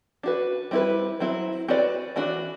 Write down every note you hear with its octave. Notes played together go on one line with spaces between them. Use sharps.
D4 F#4 B4
G3 C4 E4 B4
F#3 C4 E4
C4 F#4 B4 D5
E3 A3 D4 F#4